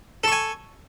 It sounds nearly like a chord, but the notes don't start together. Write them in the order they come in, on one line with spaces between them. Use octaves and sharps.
A4 C#6 G#5